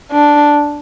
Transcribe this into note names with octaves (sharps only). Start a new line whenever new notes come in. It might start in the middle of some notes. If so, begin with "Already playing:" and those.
D4